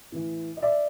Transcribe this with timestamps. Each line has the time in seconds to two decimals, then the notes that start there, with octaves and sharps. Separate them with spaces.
0.12 A2 E3
0.57 D#5
0.62 D5 E5